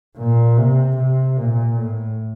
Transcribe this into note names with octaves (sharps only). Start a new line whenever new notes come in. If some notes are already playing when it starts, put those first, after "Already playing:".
A#2
C3
C3
A#2
A2